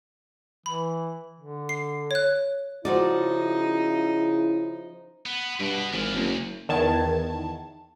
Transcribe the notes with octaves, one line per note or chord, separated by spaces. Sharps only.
E3 B5
D3
C7
C#5 F#6
C#3 F3 D#4 E4 F#4 D5
B3
G2 B2 B3
G#1 E3 F4
F#1 D2
E2 D#3 A5 G#6